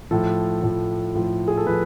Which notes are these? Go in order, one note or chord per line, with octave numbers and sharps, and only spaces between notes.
A2 F3 A4
A2 F3
A2 F3
G#4
A4
F3 B4